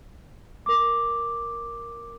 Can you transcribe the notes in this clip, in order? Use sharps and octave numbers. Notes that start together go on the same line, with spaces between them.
A#4 D6